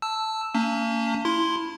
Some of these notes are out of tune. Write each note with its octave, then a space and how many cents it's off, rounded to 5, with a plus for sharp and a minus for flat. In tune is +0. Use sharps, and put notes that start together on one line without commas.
A5 +0 E6 +0
A#3 -40 C#4 +30 A5 +45
E4 +0 C6 +0